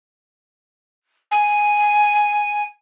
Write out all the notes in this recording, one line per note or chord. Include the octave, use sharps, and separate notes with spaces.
G#5